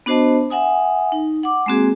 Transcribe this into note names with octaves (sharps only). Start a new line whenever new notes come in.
B3 D4 F#4 C5 D#5 A5
E5 F#5 G#5 D#6
D#4
F#5 D6
G#3 A#3 C4 F#4 G#4